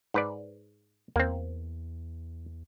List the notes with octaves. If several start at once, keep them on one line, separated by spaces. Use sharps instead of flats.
G#2 B4 D5
E2 A#3 C4